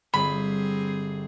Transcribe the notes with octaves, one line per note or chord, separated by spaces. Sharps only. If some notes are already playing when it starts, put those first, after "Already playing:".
G1 C4 G#4 B5